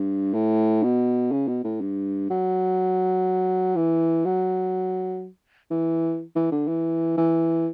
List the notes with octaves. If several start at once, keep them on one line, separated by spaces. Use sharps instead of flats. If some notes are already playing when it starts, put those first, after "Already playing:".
Already playing: G2
A2
B2
C#3
B2
A2
G2
F#3
E3
F#3
E3
E3
D3
E3
E3